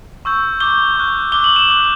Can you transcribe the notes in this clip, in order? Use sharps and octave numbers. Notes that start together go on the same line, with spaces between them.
C#6 E6 G6
D6 G6 G7
C#6 F#6
D6 F#6 G7
F#7
E7
D6 F#6